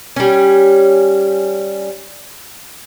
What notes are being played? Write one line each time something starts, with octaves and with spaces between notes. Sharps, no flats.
G3 C#4